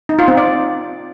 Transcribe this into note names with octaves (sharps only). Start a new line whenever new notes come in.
D#4
F4
C4
D5